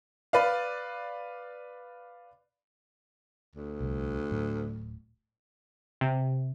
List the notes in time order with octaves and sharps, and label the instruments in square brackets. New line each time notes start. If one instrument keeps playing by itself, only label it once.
[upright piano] B4 D5 F5
[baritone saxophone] D2
[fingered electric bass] C2
D1 A2 F#3
[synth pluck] C3